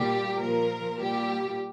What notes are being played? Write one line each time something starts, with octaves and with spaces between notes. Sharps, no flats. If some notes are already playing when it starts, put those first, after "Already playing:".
Already playing: A#2 G3 G4
A#2 F3 A#4
A#2 G3 G4